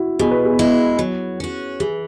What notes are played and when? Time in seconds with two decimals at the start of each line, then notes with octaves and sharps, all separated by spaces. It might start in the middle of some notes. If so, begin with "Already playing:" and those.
Already playing: E4 F#4
0.19 B2 G#4
0.31 B4
0.45 G#4
0.59 G#3 E4
0.99 F#3
1.40 C#4 F#4
1.80 E3 G#4